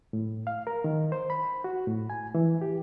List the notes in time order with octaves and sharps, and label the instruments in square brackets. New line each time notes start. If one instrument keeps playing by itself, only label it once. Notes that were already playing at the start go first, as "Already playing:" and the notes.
[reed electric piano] A2
F5
A#4
D#3
C5
B5
F#4
A2
G#5
E3
G4